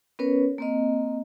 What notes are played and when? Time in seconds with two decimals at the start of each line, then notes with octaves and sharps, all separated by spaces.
0.19 B3 C#4 A#4 B4 C#5
0.58 A#3 C4 D#5